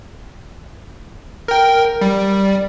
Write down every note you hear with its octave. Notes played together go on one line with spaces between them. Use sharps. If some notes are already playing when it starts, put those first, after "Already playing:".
A#4 G5
G3